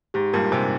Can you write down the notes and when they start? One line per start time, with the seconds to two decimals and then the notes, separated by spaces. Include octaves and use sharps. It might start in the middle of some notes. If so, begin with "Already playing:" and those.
0.14 G#2 G4
0.33 G2 A#2 A#4
0.52 G#2 C3 G#5